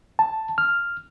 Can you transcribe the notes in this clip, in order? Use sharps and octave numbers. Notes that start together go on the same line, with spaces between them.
A5
F6